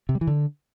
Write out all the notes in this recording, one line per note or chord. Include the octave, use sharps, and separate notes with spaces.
C3
G3
E3
D3